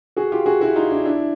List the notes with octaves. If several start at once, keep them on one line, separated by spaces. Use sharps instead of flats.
F#4 G#4
F4 G4
F#4 G#4
E4 F#4
D#4 F4
D4 E4
D4 E4